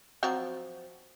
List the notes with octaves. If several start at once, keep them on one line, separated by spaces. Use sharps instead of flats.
F3 F#3 C4